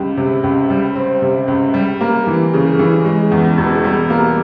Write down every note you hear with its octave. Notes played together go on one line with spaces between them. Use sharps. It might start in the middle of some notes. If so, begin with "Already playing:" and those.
Already playing: C#2 G3
C3
C#2
G3
C4
C3
C#2
G3
A#3
E3
C#3
E3
G#3
E2
E1
G3
A#3